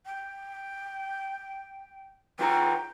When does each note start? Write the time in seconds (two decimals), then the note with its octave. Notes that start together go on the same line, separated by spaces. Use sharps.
0.06 G5
2.39 E3 F4 G5 A#5